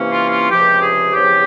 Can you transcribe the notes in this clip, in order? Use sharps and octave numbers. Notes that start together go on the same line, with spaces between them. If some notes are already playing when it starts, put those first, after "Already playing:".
Already playing: C3 E3 A#3 C#4
F4
F4
C#2 C3 F3 G4
G#4
E2 C#3 F3 C4 G4